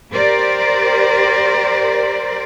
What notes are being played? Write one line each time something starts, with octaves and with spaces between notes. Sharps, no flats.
G4 A#4 C5 D5